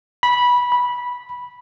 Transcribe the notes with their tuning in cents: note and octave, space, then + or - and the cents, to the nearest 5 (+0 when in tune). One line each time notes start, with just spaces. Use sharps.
B5 -15
B5 -10